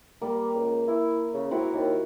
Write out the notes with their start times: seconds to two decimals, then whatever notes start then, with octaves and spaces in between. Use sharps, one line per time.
0.22 G3 A#3
0.55 C#2
0.88 E4
1.34 C#3
1.51 C4 E4 F#4 A#4
1.73 D#2